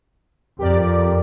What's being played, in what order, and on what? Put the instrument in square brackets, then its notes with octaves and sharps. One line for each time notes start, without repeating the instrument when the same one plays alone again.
[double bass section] F2 [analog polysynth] G4 A#4 D5